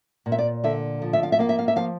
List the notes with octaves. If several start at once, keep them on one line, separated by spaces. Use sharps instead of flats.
A#2
E5
D5
D3 E5
F3
E5
F5
E5
A#3 F5
E5
F5
E5
F3 F5